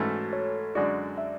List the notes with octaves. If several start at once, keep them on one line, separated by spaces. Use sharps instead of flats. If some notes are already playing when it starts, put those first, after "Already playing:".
Already playing: G#2 E3 A3 C#4 E4 F#4 A4
C#5
F#2 D3 G#3 D4 F#4 D5
E5